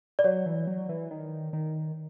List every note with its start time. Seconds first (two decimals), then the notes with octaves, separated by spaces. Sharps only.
0.19 D5
0.24 F#3 C#5
0.46 E3
0.67 F#3
0.89 E3
1.11 D#3
1.53 D#3